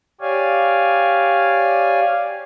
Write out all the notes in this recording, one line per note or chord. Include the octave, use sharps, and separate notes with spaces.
G4 C#5 D5 F5 G#5